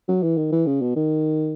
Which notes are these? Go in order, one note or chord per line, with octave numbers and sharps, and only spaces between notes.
F#3
E3
D#3
E3
C#3
B2
D#3